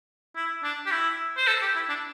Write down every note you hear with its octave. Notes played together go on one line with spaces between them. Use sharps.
E4
D4
G4
E4
C5
A4
G4
E4
D4